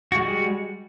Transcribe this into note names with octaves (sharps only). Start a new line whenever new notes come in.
G3 G#3 F#4